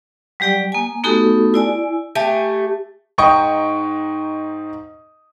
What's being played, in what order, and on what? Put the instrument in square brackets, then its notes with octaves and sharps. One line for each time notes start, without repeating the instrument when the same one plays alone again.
[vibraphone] F#3 G3 G4 D5 G5
A#3 G#5
A3 B3 D#4 F#4 G4 A4
E4 D5 G#5
[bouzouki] A3 G4 G#5
[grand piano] G#2 D#4 G5 C#6 D#6